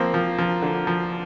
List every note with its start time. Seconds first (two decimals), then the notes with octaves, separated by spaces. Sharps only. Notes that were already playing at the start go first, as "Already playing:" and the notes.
Already playing: F3 A#3 C4
0.14 F3
0.38 F3
0.62 D3
0.87 F3